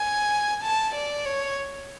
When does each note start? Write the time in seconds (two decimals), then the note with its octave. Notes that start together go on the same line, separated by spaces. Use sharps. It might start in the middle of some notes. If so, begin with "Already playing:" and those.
Already playing: G#5
0.62 A5
0.94 D5
1.25 C#5